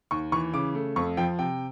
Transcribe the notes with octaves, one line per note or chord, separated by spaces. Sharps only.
D#2 C#6
E3 C#6
C#3 D6
A3
F2 C#6
F3 G5
C3 G5